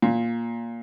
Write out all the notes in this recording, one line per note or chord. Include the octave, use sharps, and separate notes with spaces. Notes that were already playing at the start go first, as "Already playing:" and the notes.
A#2